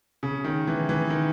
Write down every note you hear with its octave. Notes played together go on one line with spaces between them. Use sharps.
C#3
D#3
E3
E3
D#3